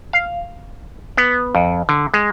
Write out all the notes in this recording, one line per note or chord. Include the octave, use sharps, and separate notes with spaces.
F5
B3
F2
D3
G#3